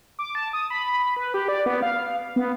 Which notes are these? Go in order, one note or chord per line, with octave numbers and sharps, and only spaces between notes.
D6
A5
D#6
B5
B4
G4
D5
B3
F5
B3